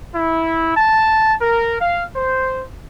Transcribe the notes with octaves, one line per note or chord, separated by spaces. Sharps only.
E4
A5
A#4
F5
C5